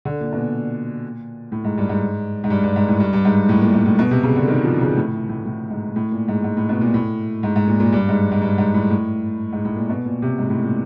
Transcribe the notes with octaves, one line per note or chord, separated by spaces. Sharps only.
D3
A#2
B2
A#2
A2
G#2
G2
G#2
G#2
G2
G2
G#2
A2
G2
G2
G#2
A2
A#2
G#2
A2
B2
C3
C#3
D3
D#3
F3
C#3
A2
A2
A2
G#2
A2
A#2
G#2
G#2
A2
B2
A#2
A2
G#2
G#2
A#2
A#2
G2
G#2
G#2
G2
G#2
A2
A2
G#2
A2
A#2
B2
A#2
C3
G#2
A2
A#2